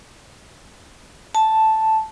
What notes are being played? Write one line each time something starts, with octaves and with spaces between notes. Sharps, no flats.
A5